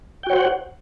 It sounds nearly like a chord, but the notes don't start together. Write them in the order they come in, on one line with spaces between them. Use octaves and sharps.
G5 F#4 C#5 C5 F#5